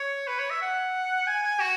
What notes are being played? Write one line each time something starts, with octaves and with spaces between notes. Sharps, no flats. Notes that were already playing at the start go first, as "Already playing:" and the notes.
Already playing: C#5
B4
C#5
E5
F#5
G#5
G#5
F#4